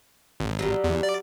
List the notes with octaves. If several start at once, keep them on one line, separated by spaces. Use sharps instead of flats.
G#1
F#3 G3
E2
D5